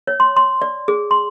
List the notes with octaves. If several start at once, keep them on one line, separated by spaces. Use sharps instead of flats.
C#5
C6
C6
D5
G#4
C6